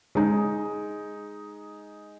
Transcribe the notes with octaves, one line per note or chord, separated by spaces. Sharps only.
G#3 D#4